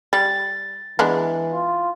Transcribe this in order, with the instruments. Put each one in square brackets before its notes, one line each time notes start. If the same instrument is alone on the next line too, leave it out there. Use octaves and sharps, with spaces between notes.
[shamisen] G3 [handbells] A6
[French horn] E3 [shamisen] G#3 B3 D4
[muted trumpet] F4